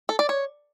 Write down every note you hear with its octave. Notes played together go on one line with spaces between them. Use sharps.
A4
D5
C#5